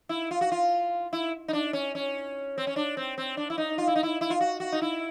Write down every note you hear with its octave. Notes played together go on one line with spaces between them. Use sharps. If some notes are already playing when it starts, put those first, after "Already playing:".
E4
F4
F#4
F4
E4
D#4
D4
C#4
C#4
C4
C#4
D4
C4
C4
D4
E4
D#4
F4
E4
D#4
E4
E4
F4
F#4
F#4
D#4
E4